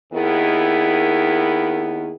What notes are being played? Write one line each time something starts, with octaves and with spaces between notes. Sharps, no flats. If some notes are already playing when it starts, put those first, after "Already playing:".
D#2 D#3 B3 E4 G#4